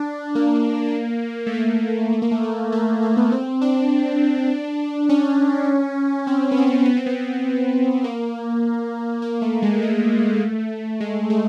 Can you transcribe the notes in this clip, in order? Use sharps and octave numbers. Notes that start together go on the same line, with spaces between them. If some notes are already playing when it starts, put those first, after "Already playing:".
Already playing: D4
A#3
A3
A#3
A3
A#3
A3
A3
A3
A#3
B3
C4
D4
C#4
C4
B3
C4
B3
C4
B3
A#3
A#3
A3
G#3
A3
G#3
A3